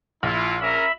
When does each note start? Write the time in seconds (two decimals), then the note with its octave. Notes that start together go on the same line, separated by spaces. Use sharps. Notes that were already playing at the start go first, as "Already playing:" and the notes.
0.23 A#1 E4 F4
0.61 C#4 A#4 E5 B5